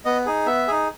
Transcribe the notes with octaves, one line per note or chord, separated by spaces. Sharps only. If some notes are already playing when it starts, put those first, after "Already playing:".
B3 D#5
D#4 G#4
B3 E5
D#4 G#4